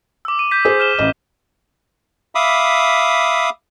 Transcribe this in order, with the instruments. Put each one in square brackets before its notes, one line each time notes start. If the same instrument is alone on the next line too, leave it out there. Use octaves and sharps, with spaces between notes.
[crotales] D6 E6
D#7
G6 B6
[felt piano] G#4 C5
[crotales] F6 E7 G7
[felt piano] A1 D#5
[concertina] E5 F5 B5 D6 D#6